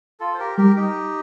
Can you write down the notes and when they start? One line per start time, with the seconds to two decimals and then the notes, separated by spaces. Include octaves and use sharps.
0.20 F4 A4
0.34 C5
0.39 G4 A#4
0.58 G3 G4 A#4
0.76 D#4 G4